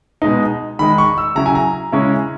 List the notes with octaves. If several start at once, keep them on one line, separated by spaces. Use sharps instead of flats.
B2 G#3 D#4
D#3 G#3 D#4 B5
C#6
E6
C#3 F#3 C#4 E4 A#5
G#5
A#5
C#3 G#3 C#4 E4